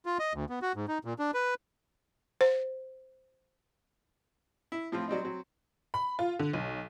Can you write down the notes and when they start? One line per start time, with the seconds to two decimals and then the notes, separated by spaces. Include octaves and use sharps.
0.06 F4
0.19 D#5
0.34 D2
0.49 B3
0.62 F#4
0.75 G#2
0.88 D#4
1.05 A#2
1.19 D4
1.34 B4
2.41 C5
4.72 E4
4.92 A2 F3 C4 F4
5.08 F#3 G3 C4 D#4
5.21 F#3 C4
5.94 B5
6.19 F4
6.39 D3
6.53 B1